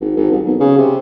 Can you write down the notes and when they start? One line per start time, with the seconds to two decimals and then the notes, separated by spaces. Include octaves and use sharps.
0.01 G#1
0.17 G#1
0.32 C2
0.45 B1
0.60 C#3
0.78 C3